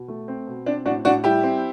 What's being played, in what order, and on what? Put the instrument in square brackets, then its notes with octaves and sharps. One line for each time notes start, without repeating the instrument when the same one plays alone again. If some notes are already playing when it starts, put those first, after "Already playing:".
Already playing: [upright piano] B2
A3
C4
B2
C4 D4
A2 D4 F#4
A2 D4 F#4
G3 E4 G4
C4